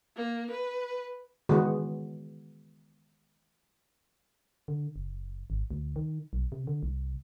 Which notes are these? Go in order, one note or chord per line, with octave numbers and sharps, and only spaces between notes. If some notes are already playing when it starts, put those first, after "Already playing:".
A#3
B4
D#3 E3 G#3 B3 F#4
D3
F#1
G#1
D2
D#3
B1
C3
D3
C2